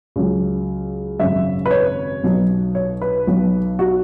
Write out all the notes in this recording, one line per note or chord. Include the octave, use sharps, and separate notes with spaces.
C#2 C#3 F#3
G#1 F#2 C#3 E5
B4
C#5
B1 B2 F#3
C#5
B4
B1 B2 F#3
F#4